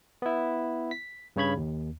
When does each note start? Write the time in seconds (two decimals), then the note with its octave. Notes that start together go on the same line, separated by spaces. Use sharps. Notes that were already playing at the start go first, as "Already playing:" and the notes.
0.22 B3 E4
0.91 B6
1.36 G2 C#3 C#5 B5 G#6
1.57 D#2